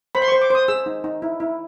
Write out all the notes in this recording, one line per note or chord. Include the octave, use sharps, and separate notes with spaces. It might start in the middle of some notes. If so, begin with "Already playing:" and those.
C5 B5
C6
C5 C#6
D6
C5 D#6
G#4 E6
D#4
D#4
E4
E4